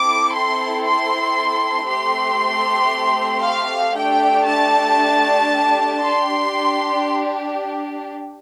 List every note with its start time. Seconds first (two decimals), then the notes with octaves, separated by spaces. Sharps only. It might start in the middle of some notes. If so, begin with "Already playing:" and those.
Already playing: C4 E4 A4 D6
0.33 C6
0.85 C6
1.88 A3 C4 G4 C6
3.44 F5
3.96 A3 D4 G4 G5
4.48 A5
6.03 D4 G4 C6